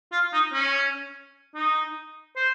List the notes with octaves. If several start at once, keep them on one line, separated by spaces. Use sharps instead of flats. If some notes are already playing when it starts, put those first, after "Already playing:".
F4
D#4
C#4
D#4
C5